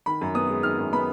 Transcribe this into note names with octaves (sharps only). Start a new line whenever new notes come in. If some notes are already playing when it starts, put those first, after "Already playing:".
D#3 B5
F#2
B3 D#6
G#3
D#3 F6
F#2
B3 B5